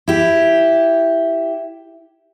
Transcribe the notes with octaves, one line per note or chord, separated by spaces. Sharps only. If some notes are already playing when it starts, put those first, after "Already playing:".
E4 G4